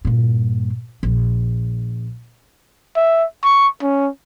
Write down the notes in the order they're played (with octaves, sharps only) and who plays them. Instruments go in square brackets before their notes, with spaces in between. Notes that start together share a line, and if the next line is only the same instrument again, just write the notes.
[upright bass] G2 A#2
A#1
[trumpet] E5
C#6
C#4